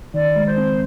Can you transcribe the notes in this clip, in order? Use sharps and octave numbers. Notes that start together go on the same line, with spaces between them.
D#3 D5
G#3
C5
C4